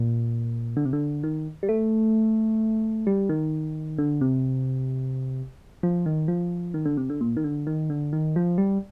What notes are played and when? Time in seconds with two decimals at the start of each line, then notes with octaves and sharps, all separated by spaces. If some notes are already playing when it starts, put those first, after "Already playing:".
Already playing: A#2
0.77 D3
0.85 C3
0.93 D3
1.24 D#3
1.63 G3
1.69 A3
3.07 G3
3.29 D#3
3.98 D3
4.21 C3
5.83 F3
6.06 D#3
6.28 F3
6.74 D#3
6.86 D3
6.97 C3
7.10 D3
7.21 A#2
7.37 D#3
7.44 D3
7.67 D#3
7.90 D3
8.13 D#3
8.36 F3
8.58 G3